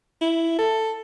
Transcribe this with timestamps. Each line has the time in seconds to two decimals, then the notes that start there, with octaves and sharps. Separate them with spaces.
0.21 E4
0.59 A4